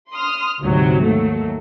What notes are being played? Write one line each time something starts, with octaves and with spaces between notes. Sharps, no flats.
C6 D#6 F6
D2 G#2 C3 F#3
D#2 F#3 A3